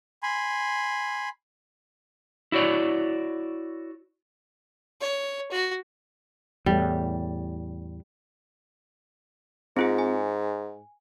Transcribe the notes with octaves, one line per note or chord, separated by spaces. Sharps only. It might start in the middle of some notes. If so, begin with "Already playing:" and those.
G#5 B5 C6
E4 F#4 C#5 D5
C#5
F#4
E2 A2 G3
G#2 C4 F4 G#4
G#5